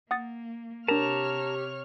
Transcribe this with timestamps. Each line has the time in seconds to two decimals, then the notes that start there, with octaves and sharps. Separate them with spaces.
0.11 A#3 F#5 D#6 A6
0.88 C3 D4 G4 A#4 C#5 A5 A#5 F6